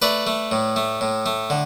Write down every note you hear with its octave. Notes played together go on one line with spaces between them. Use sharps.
A3 B4 D5
A3
A2
A3
A2
A3
D3